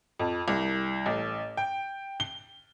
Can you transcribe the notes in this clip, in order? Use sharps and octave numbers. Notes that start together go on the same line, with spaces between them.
F2
C2
A1
G5
G7